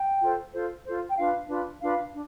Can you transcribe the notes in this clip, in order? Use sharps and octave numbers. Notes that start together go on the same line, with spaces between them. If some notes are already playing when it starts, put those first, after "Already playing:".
Already playing: G5
F4 A4 C5
F4 A4 C5
F4 A4 C5
G5
D4 F4 B4 F5
D4 F4 B4
D4 F4 B4 F5
D4